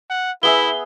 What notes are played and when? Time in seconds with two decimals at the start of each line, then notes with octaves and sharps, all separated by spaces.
0.10 F#5
0.43 B3 E4 G#4 E5 G7